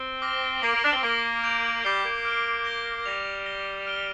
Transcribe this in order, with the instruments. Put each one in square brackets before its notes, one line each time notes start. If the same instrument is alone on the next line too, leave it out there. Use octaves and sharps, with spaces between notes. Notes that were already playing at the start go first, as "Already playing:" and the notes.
Already playing: [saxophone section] C4
[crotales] D6 F6 A#6 G7
[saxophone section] A#3 [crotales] D6 A#6 D7 F7
[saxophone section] A#3
D4
C4
[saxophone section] A#3 [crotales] D6 A#6 G7
[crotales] G6 D7 F7
[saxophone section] G3 [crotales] D6 G6 C7 G7
[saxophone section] A#3
[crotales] F6 D7 G7
G6 A#6 G7
[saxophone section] G3 [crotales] A#6 F7
[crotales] A#6 G7
F6 D7 G7